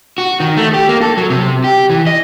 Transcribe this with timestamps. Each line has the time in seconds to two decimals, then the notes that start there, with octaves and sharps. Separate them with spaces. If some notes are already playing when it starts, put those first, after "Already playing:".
0.18 F#4
0.40 D#3
0.57 A3
0.74 G4
0.89 A#3
1.02 A4
1.17 F#3
1.30 C3
1.64 G4
1.90 E3
2.07 D#5